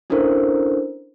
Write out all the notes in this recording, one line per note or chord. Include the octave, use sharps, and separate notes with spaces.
C#4 D4 E4 A4 A#4 C5